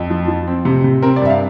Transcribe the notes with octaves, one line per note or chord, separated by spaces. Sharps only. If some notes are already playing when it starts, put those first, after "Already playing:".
Already playing: F2
F3
F3
C4
C3
C3
C4 A#4
D5
G2 E5
F5